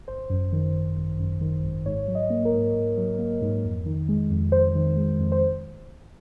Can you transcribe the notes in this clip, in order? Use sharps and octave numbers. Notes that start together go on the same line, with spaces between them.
G#1 C5
F#2
D#3
G#1
G#1
F#2
D#3
G#1
G#2 C#5
F#3
D#5
A#3
A#4
G#2
G#2
F#3
A#3
G#2
F2
D#3
G#3
F2
F2 C5
D#3
G#3
F2
C5